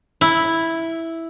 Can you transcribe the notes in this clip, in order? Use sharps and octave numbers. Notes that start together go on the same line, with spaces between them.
E4